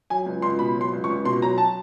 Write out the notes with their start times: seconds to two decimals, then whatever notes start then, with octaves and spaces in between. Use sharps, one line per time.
0.10 F#3 G#5
0.26 C#2
0.42 C#2 C6
0.59 B2 B5
0.76 F#3 C6
0.93 C#2
1.04 C#6
1.09 C#2
1.25 B2 C6
1.41 F#3 A#5
1.58 A5